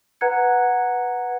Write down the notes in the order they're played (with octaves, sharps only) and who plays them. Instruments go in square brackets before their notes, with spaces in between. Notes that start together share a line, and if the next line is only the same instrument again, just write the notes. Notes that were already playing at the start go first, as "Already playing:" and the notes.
[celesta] B4 F#5 A#5 F#6 G#6 C#7